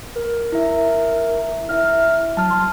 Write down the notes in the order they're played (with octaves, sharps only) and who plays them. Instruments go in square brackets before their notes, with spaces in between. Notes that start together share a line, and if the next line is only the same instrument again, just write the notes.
[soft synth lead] A#4
[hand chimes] E4 E5
[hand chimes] E4 E5 [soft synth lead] F6
[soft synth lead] F#3 [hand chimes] A5 F6
[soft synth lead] C6